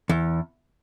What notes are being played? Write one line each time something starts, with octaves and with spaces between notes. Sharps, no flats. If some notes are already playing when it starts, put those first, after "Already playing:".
E2